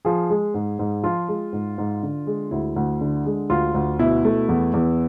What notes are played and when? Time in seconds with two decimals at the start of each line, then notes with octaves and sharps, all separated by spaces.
0.05 F3 G#4
0.30 G#3
0.54 G#2
0.79 G#2
1.03 F3 F4
1.28 G#3
1.53 G#2
1.78 G#2
2.03 D3
2.27 G#3
2.51 D2 E4
2.76 D2
3.01 D3
3.26 G#3
3.50 D2 F4
3.74 D2
3.99 B2 E4
4.25 A3
4.49 E2
4.74 E2